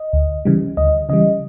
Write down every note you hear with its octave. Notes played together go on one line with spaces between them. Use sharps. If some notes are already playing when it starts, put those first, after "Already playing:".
Already playing: D#5
D2
C#3 E3 G3
D2 D#5
C#3 E3 G3 D#5